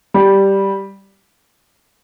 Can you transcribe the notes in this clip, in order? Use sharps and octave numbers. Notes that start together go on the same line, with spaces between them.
G3